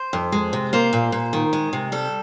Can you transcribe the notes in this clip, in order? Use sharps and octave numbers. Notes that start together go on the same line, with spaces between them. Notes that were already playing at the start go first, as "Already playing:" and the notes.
Already playing: C5
F2
G#3
C3
A#3 C5
A#2
A#2
D#3
G#3
C3
G3 A4